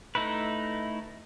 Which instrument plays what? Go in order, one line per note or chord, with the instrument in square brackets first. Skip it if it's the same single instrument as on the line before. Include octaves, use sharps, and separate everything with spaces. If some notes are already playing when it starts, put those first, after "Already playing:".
[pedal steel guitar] A3 D#4 E4 B4